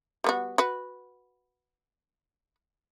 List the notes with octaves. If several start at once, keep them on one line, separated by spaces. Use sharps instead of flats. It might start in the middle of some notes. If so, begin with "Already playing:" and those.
G3 B3 F#4
F#4 B4